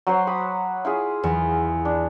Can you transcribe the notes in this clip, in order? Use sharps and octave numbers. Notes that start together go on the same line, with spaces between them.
F#3 F#4 C5
B5 D6 D#6
E4 F4 G#4
E2
D4